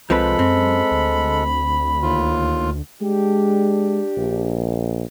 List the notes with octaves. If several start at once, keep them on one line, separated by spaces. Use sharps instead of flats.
C2 F3 G#3 C4 A4 B4 B5
F#2 C4
D2
D#2 F4
G#3 D4 G4
A#1